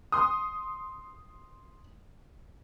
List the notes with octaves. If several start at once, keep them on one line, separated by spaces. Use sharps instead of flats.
C6 D#6